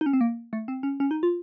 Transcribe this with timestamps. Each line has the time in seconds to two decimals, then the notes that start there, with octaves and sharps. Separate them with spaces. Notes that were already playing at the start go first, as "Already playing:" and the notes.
0.01 D#4
0.06 C#4
0.13 C4
0.21 A#3
0.53 A3
0.68 C4
0.83 C#4
1.00 C#4
1.11 D#4
1.23 F4